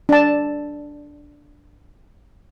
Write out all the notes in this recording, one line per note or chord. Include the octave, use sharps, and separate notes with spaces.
D4 A5